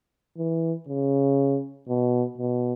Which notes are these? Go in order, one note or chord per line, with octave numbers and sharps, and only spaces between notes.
E3
C#3
B2
B2